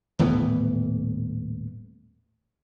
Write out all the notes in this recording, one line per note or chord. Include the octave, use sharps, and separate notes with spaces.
D#1 A2 E3 B3